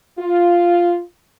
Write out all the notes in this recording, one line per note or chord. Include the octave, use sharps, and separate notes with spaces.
F4